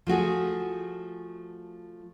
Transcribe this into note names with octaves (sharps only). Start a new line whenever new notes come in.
F3 A3 F#4 G#4